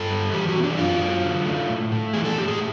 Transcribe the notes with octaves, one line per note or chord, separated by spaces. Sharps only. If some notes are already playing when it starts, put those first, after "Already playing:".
Already playing: G2 A4
G3
E3 G4
F#4
B3
D4
F#2 F4
F#3
D3
A3
A2
A3
E3 G#4
A4
A2 G4
G#4